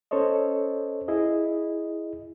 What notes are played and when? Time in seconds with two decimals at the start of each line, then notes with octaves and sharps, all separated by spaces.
0.11 C#4 A4 C5 C#5 D#5
1.08 E4 G#4 D#5